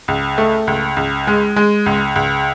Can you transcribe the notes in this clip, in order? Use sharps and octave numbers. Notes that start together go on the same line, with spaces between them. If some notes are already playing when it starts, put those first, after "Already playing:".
C#2
A3
C#2
C#2
G#3
G#3
C#2
C#2